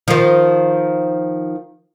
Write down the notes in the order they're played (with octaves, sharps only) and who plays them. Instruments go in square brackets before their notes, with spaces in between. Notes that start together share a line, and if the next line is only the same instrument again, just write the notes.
[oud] D#3 F3